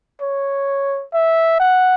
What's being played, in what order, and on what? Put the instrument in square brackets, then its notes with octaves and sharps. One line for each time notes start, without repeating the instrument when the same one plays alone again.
[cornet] C#5
E5
F#5